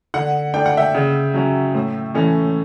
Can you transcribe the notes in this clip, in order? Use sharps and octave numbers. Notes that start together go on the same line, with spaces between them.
D3 F#5
A3 D4 G5
F#5
E5 G5
C#3
F#3 C#4
A2
E3 A3 C#4